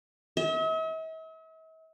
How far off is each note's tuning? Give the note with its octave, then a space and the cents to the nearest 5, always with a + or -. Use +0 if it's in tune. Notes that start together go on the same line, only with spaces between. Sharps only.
E5 -45